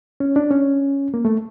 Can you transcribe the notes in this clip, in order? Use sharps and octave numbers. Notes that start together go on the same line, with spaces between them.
C#4
D4
C#4
A#3
A3